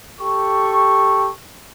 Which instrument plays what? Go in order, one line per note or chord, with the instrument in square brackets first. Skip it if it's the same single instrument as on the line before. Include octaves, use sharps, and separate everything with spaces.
[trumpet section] G4 A4 C#6